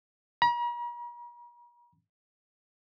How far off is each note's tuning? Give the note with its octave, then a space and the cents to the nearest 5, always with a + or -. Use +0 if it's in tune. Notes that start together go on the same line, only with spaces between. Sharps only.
A#5 +45